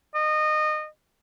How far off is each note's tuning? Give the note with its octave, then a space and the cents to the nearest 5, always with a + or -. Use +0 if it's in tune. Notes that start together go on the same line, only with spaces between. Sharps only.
D#5 -25